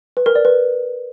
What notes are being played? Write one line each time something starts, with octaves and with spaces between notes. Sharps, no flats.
B4
A#4
D5
B4